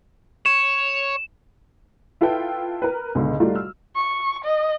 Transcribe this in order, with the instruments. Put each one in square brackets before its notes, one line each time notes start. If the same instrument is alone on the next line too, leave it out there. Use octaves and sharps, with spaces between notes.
[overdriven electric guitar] C#5 [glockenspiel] E7
[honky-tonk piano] E4 F4 A4 B4 G5
A#4 B4
C#2 G#2 B2 D3
G3 A3 D#4 F4 F#4
E6 F6
[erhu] C#6
D#5